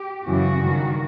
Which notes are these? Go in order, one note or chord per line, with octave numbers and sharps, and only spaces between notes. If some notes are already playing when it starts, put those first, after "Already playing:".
Already playing: G4
F#2 C#3 E3 F#4
G2 D#3